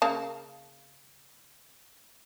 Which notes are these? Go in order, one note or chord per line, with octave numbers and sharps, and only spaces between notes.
C#3 A#3 A5